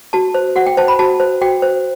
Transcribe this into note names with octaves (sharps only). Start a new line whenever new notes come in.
F#4 A5
C5
F#4 F#5
G5
C5 A5
B5
F#4 A5
C5
F#4 G5
C5